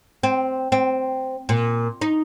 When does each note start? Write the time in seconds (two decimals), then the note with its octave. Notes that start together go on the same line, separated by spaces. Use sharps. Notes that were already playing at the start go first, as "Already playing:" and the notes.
0.23 C4
0.72 C4
1.49 A#2
2.01 D#4